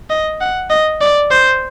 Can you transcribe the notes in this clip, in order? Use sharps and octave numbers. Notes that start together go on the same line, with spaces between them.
D#5
F#5
D#5
D5
C5